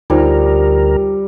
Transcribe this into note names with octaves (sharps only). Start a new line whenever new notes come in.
D2 G3 D#4 F4 A#4 C5